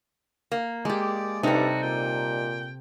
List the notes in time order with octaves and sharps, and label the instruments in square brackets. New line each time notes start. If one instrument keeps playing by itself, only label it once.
[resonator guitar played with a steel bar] A#3
[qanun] G#3 G4 [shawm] D5
[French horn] G2 [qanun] C3 A4 [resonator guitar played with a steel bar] G3 D#4 [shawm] F#4
[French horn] A#2 [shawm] G5